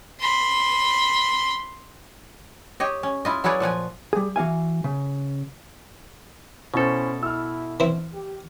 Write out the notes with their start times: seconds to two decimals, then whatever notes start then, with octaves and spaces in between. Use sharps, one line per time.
0.20 B5 C6
2.80 G4 C#5 D#5
3.03 C#4
3.25 E4 F4 D#5
3.44 F#3 E4 G#4 B4 C#5 D5
3.60 A#2 F3 F#5 G#5
4.13 G3 G#4
4.36 E3 F#4 F5 G#5
4.84 C#3
6.74 B2 C#4 E4 A4 C5
7.23 E4 E6 F6
7.80 E3 C4
8.14 G4